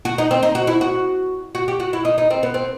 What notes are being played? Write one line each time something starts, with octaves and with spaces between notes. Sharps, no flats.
F#4
D#4
C4
D#4
F#4
E4
F#4
F#4
G4
F#4
E4
D#4
D#4
C4
B3
C4